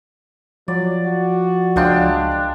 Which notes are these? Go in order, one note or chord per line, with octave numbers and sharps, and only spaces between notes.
F3 F#3 D5
F#4
C#2 G#3 D4 F5 G5